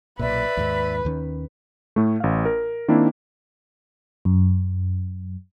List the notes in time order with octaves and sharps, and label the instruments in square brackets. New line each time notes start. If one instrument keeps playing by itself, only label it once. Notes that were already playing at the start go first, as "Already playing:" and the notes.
[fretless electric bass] B1 A#2 [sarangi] B4 [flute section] D5 E5 E6
[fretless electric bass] D#2 G#2
D#2 D#3 C#4
[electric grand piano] A2 A3
A1 F5
A#4
D#3 A#3 C4 D4 E4
[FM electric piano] F#2